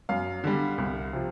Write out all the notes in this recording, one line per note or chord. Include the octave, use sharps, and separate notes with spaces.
F#2 F5
D3 G3
C2
C3 F3